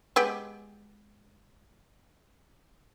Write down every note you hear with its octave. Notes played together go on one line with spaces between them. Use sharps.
G#3 B3 G4